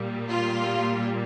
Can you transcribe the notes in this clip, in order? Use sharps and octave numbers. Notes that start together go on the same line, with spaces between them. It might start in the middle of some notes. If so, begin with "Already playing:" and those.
Already playing: A#2 G3 A#3
F4